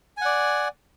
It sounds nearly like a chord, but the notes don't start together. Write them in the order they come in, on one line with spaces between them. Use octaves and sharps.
G#5 F#5 D5